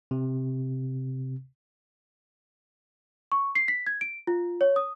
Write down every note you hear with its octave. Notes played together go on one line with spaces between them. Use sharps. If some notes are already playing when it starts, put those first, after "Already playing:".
C3
C#6
C7
B6
G#6
D7
F4
C#5
D#6